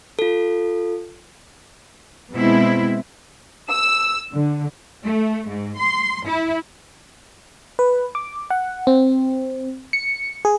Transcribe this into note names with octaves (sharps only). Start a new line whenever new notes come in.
F4 A4
B2 G#3 C4 E4
E6
D3
A3
G#2
C6
E4
B4
D6
F#5
C4
C#7
G#4